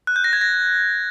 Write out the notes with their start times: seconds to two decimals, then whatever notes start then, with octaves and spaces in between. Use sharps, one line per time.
0.07 F#6
0.16 G6
0.24 A#6
0.33 G#6
0.41 A#6